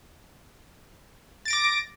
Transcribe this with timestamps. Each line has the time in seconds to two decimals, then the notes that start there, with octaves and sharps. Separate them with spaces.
1.45 A6
1.48 D7
1.50 A#6
1.53 D6